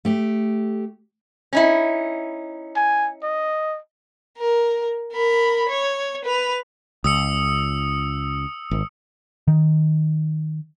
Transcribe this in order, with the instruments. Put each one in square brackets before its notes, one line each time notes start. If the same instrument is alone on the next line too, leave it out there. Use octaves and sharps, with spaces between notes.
[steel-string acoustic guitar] A3 G4
[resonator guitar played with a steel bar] C#4 D#4 E4
[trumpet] G#5
D#5
[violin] A#4
A#4 B5
C#5
B4 F7
[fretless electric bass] C#2 [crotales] D#6 E6 C#7
[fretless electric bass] G#1
[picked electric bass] D#3